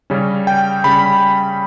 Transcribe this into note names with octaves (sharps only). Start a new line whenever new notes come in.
C#3 G3 C#4
G5
C#3 G3 C#4 B5